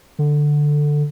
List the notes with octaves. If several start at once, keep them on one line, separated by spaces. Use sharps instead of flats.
D3